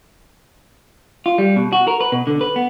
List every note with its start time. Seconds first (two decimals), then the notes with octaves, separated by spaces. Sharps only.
1.26 F4
1.38 G3
1.56 B2
1.73 F#4
1.87 A#4
2.01 B4
2.12 B2
2.27 D3
2.41 B4
2.56 B3